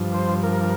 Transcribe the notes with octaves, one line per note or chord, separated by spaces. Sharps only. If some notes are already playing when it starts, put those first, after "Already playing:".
Already playing: G2 F3
C5
A#4